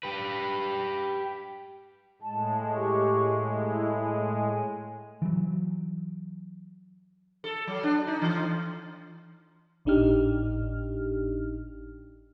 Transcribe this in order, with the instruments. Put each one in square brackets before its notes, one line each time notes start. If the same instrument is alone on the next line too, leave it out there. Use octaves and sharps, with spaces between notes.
[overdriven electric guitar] G4 B4
[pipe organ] A2 G#3 [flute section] A5
[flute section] G4 C#6
E4
G#5
[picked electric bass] E3 F#3
[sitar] A4
F#3
D4
D#4
E3
[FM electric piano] G#1 A2 D4 D#4 G4 F6